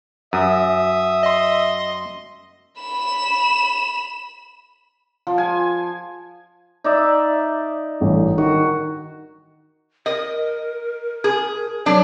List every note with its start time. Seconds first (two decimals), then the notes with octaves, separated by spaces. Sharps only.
0.33 F#2 E5 D#6
1.23 D#5 C6
2.80 B5 E7
5.27 F3
5.38 G#5
6.84 D#4 D5 E5
8.00 A1 G2
8.38 D#3 F#4
10.06 A#4 D#5
11.24 G#4
11.86 F#3 D4